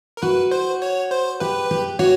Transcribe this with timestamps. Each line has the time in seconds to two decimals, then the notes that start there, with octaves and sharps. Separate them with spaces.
0.17 A#4
0.22 F#4 B4
0.51 C5
0.82 C#5
1.11 C5
1.40 G4 B4
1.71 G4
1.99 F#4 C#5